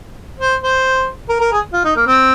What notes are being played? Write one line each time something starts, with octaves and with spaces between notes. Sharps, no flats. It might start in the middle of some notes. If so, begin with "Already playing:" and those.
C5
C5
A#4
A#4
G#4
F4
D#4
A#3
C4